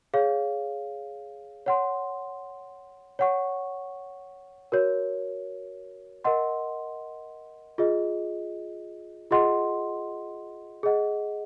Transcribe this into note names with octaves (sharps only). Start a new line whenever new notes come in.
G#4 C#5 F5
C#5 F#5 C6
C#5 F#5 C#6
F#4 A#4 C#5
A#4 D#5 F#5 C6
F4 G#4 D#5
F4 G#4 D#5 F#5 C6
G#4 D#5 F#5